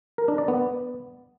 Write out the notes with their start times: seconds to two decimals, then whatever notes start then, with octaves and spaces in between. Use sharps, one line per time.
0.18 A#4
0.28 D4
0.38 D5
0.48 B3